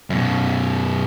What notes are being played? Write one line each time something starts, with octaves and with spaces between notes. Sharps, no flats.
F#2 B2